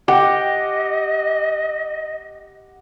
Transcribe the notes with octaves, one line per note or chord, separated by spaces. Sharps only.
G4 D#5 F#5